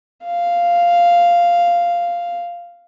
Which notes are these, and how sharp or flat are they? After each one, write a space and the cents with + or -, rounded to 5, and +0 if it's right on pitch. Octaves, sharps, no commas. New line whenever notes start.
F5 -5